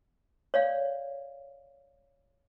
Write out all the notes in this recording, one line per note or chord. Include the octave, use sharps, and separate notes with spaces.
C#5 D5 F5